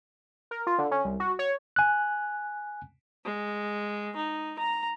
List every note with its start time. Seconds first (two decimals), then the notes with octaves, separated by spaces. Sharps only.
0.51 A#4
0.67 F4
0.78 D3
0.91 C#4
1.05 C2
1.20 F#4
1.39 C#5
1.76 G#5 F#6
3.25 G#3
4.16 D#4
4.59 A#5